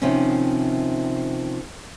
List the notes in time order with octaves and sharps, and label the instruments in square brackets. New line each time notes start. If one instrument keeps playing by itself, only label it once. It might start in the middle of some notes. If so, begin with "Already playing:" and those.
[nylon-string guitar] C3 D#3 F3 C4 C#4